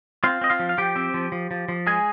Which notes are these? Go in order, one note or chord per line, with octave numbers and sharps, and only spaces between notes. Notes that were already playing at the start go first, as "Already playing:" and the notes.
C4 F4 F5
C4 D#5
F4 F5
F3
F5
F3 G4 G5
C4
F3
F3
F3
F3
G#3 G#4 G#5